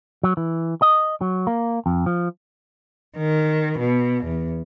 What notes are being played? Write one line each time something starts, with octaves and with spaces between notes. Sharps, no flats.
F#3
E3
D#5
F#3
A#3
F2
F3
D#3
B2
E2